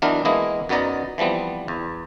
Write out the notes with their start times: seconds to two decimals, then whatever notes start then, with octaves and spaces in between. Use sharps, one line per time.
0.02 E3 F#3 B3 D4 D#4 A#4
0.25 E3 G#3 A#3 B3 E4 D#5
0.69 F#2 F#3 B3 D#4 D5 A#5
1.18 E3 F3 G3 B3 C4
1.68 E2